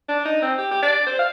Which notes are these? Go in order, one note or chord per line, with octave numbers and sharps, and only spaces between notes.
D4
D#4
C4
G4
G4
D5
C5
F5